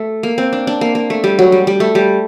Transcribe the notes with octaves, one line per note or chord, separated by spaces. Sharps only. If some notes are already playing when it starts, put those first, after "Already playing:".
Already playing: A3
A#3
C4
D4
D4
A#3
A#3
A3
G3
F#3
G3
G3
A3
G3